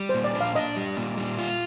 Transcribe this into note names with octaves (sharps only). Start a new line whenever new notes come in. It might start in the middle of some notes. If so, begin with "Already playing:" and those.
Already playing: G3
A#2 C5
D5
D4
F5
D4 D#5
G3
A#2
G3
F4